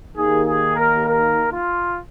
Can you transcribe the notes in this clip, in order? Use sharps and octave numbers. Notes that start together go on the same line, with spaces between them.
D#2 D#3 A#3 G#4
G#4
A#4
A#4
F4